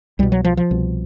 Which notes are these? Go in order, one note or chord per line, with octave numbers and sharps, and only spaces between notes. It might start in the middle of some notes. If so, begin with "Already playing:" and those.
C2 B2 G3
F#3
F3
F3
C2 B2